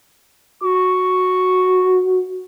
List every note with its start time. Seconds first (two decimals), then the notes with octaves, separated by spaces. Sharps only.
0.63 F#4 C#6